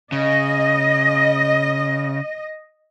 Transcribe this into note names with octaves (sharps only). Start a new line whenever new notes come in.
C#3 D#5